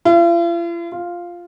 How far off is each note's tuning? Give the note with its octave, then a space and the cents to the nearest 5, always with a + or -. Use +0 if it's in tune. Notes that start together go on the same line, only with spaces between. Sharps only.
F4 -45
F4 +0